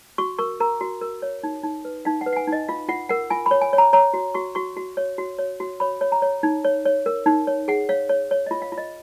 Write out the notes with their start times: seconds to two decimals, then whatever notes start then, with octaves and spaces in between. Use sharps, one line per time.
0.18 F#4 C#6
0.39 A#4 C#6
0.60 A#4 A#5
0.81 F#4
1.01 A#4
1.22 C#5
1.43 D#4
1.64 D#4
1.85 B4
2.05 D#4 F5
2.21 F#5
2.26 B4
2.33 F#5
2.36 G#5
2.47 D#4
2.52 D#5
2.68 F4 F5
2.89 F4 F#5
3.09 A#4 F#5
3.30 F4 G#5
3.46 C#5 B5
3.61 G#5
3.73 C#5
3.78 A#5
3.93 C#5 A#5
4.14 F#4
4.34 F#4 C#6
4.55 F#4 C#6
4.77 F#4
4.97 C#5
5.18 F#4
5.38 C#5
5.60 F#4
5.80 C#5 B5
6.01 C#5
6.12 A#5
6.22 C#5
6.43 D#4
6.64 C#5
6.85 C#5
7.06 A#4
7.26 D#4
7.47 C#5
7.68 G#4 F#5
7.89 C#5 F5
8.09 C#5
8.31 C#5
8.46 F4 D#5
8.62 F5
8.72 F4
8.78 D#5